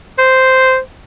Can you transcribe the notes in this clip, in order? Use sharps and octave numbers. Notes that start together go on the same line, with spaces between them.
C5